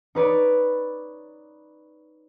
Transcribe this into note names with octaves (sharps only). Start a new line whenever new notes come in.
D#4 B4 C#5 D5